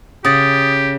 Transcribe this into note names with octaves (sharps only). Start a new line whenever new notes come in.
C#3 G4 F#5 D#6 A6